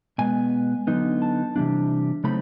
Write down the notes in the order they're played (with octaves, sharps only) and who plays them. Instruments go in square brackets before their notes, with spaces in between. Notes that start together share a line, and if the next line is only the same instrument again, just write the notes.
[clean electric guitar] B2 G#3 B3 G#5
D3 F#3 B3 D#4
A5
C3 E3 G3 A#3 D4
C#3 F#3 A3 C4 D#4 B5